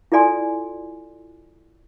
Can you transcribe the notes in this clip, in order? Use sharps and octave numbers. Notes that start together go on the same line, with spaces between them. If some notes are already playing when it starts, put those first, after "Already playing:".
E4 F4 A4 D5 G#5 C6